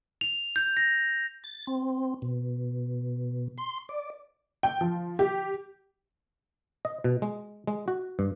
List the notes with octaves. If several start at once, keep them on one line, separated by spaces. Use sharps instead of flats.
F7
G6
A#6
A6
C4
B2
C6
D5
G5
F3
G4
D#5
B2
G#3
G#3
F#4
G2